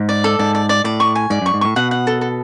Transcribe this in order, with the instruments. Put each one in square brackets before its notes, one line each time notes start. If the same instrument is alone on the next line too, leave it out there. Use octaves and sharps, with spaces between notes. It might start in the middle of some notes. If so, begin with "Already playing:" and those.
Already playing: [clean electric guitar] G#2
[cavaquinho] D5
A4
[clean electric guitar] G#2 [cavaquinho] D5
[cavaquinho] D5
D5
[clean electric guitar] A2 [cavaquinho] D5
[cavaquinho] C#6
G#5
[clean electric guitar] G#2 [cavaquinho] D5
[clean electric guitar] F#2 [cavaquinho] C#6
[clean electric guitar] G#2
[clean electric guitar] A2 [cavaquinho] C#6
[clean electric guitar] B2 [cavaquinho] F#5
[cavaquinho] F#5
A4
A4